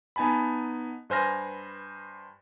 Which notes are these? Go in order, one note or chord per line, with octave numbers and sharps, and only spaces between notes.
B3 D#4 G#5 A5 B5
G2 B4 C5 G#5 F6 A#6